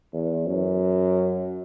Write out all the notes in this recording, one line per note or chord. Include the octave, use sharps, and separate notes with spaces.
E2
F#2